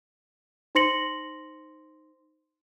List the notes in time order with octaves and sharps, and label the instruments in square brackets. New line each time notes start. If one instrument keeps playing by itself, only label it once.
[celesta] D#4 C5 C6 A#6 C#7 F#7